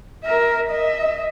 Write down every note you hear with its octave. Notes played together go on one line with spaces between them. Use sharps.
A#4 E5
D#5 E5